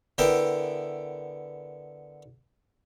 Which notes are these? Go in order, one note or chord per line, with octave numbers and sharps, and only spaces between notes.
D3 B3 E4 A#4 E5 G5